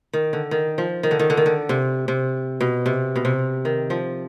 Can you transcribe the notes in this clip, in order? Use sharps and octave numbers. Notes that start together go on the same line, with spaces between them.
D#3
D3
D#3
F3
D#3
D3
D#3
D3
D#3
D3
C3
C3
B2
C3
B2
C3
D#3
F3